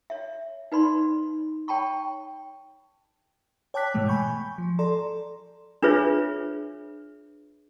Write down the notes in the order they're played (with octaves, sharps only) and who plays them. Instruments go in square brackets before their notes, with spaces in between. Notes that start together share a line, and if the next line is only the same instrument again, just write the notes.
[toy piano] C#5 E5
D#4 B4 D5 B5 C6
C#5 G5 A5 B5 C#6
[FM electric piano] C#5 G5 A5 D6 F#6 B6
G#2 B2 E3 G#3 A3
G#5 B5 C#6 G6
F3
A4 D5 A#5 C6
[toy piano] D4 F4 G#4 B4 C#5 E5